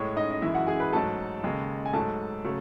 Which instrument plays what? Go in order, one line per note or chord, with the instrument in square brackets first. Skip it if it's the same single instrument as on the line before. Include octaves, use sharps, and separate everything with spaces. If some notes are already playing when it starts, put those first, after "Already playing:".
Already playing: [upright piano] A2 G#3 C#5
D#4 D#5
D#5
F#2 E3 G#3 E4 E5
F#4 F#5
G#4 G#5
B4 B5
G#2 F#3 A3 A4 A5
D#2 C#3 G#3
G#5
G#2 F#3 A3 A4 A5
C#3 F#3 A3